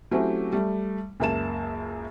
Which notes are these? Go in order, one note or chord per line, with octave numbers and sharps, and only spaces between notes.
F#3 A3 C4 C#4 E4 G4
G3 A3
C#2 F#2 A#3 E5 A5 E7